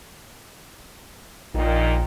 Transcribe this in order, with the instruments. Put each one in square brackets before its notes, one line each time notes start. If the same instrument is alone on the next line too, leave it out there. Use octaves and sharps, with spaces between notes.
[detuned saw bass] A#1 [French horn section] A#2 D#3 D#4